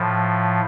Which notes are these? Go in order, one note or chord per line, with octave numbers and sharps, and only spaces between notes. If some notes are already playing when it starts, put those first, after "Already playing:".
Already playing: A2 F3